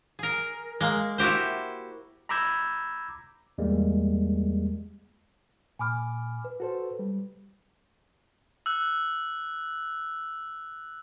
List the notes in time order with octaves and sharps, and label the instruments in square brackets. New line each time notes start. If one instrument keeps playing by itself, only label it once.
[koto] G#4 A#4
G#3 A#3
E4 F#4 G4 C5
[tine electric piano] A#5 B5 D6 E6 G6 G#6
E2 G3 G#3 A#3
[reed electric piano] A#2 D6 [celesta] G#5 B5 F6
[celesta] B4
[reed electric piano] F#4 A4 C5
G3
[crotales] E6 F#6